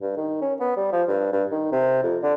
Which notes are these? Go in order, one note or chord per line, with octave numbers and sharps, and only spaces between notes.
G2
D#3
C#4
B3
G3
F3
G2
G2
D#3
C3
F2
D3